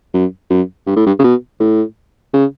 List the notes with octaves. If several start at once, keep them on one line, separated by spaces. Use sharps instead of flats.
F#2
F#2
G2
A2
G2
C#3
B2
A2
C#3